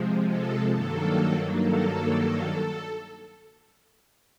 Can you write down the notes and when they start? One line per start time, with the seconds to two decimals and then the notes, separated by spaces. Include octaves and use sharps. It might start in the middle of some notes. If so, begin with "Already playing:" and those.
Already playing: C3 F3 G#3
0.29 A4
0.73 G2 D#3 F#3 A#3 A4
1.61 A4